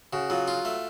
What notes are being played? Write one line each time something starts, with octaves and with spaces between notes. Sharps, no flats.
C#3 F#4
F#3 F4
F4
A3